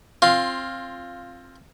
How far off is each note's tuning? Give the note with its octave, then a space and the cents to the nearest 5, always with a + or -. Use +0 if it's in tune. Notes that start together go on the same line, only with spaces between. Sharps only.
C4 +20 F4 +0 F5 +0